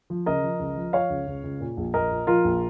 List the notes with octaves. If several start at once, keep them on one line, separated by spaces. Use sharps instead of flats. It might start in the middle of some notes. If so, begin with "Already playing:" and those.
F3
C#3 A#4 D#5
F3
C#2
F3
F3 C#5 F5
C#2
C#2
C#2
A#2
A#1
A#1 A#4 D#5
A#2
F3 F4 A#4
A#1